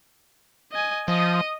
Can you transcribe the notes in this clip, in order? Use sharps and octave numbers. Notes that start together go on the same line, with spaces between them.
D#5 G#5
F3 D#5 D#6